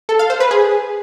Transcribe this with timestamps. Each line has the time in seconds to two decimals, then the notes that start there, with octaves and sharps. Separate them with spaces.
0.09 A4
0.19 F5
0.30 C5
0.40 B4
0.51 G#4